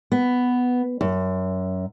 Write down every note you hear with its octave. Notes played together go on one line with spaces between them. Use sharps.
B3
F#2